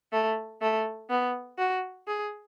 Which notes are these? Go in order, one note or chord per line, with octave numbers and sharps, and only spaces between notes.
A3
A3
B3
F#4
G#4